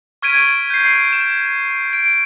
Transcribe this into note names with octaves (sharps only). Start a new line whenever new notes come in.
C#6 F6 G#6 B6 D7 D#7
G6 C7
E7
D7